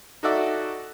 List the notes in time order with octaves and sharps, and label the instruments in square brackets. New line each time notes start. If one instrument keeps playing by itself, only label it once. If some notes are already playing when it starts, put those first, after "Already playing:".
[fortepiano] D#4 F#4 A4 D5 E5